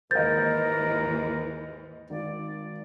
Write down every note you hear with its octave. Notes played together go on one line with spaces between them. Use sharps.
D#2 G#2 E3 A#4 C5 D#5 G6 A6
G#1 D5